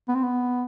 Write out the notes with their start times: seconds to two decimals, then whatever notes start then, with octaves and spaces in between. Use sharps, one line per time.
0.08 B3
0.15 C4
0.23 B3